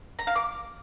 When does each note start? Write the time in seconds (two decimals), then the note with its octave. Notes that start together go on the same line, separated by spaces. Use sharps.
0.19 A#5
0.27 F5
0.36 D6